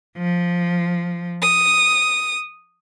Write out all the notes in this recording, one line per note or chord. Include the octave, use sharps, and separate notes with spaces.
F3
D#6